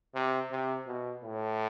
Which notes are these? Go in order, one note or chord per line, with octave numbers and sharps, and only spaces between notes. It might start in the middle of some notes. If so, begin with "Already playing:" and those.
C3
C3
B2
A2